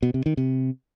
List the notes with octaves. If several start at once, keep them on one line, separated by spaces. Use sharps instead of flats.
B2
C3
D#3
C3